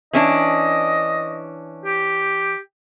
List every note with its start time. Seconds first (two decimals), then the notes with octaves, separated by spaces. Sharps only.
0.13 E3 C#4 D4 D#5
1.85 G4